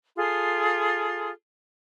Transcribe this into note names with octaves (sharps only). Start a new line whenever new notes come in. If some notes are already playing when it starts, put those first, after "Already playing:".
F4 G#4 A4 C6